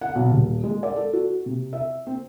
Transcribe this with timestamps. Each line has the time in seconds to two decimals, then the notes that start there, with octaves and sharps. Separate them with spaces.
0.01 F#5
0.15 B1
0.31 D#1
0.64 G#3
0.83 D5
0.96 A4
1.13 F#4
1.46 C3
1.73 E5
2.07 C4